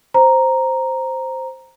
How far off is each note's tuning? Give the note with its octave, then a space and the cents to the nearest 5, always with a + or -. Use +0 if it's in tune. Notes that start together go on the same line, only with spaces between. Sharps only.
C5 +0 A#5 +0